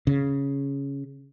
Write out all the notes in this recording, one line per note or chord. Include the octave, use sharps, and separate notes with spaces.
C#3